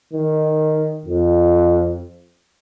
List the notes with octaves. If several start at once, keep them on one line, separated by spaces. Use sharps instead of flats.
D#3
F2